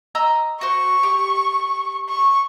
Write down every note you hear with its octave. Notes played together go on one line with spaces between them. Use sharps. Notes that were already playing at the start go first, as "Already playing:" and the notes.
D#5 A#5 E6
F#4 C5 C#6
G4
C#6